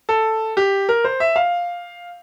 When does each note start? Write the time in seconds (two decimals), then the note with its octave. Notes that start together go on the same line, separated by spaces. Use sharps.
0.09 A4
0.57 G4
0.89 A#4
1.04 C5
1.20 E5
1.36 F5